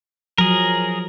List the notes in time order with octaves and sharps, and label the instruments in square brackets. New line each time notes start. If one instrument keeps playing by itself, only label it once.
[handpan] F3 F#3 [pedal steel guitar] G#4 A#4